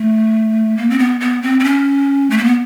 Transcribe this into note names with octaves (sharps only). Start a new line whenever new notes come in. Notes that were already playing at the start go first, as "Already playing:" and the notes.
Already playing: A3
A#3
C4
B3
B3
C4
C4
C#4
A3
A#3
B3